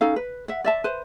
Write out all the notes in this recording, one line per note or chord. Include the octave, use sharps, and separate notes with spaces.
C#4 D#4 A4 F5
B4
E5 F#5
D5 E5 A5
B4 C5